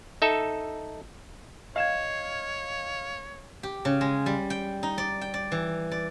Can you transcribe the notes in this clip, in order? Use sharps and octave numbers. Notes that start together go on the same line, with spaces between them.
D#4 A4 E5
C#5 D#5 F5 G#6 E7
G4
C#3
G#3
G3
G5
D#4
D5
G5
D5
E3
D5